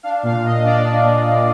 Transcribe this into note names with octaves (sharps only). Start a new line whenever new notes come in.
D4 F5
A#2 F5
A#2 D#5
D4 D5
D4
A#2
A#2